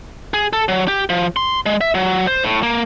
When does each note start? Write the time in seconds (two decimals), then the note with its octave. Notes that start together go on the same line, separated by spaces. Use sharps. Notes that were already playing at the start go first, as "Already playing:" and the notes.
0.34 G#4
0.53 A4
0.68 F#3
0.88 G4
1.09 F3
1.36 C6
1.66 G#3
1.81 E5
1.95 F#3
2.27 C5
2.45 A2
2.63 A#3